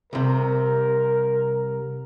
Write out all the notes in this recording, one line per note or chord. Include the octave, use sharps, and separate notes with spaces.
C2 C3 A#4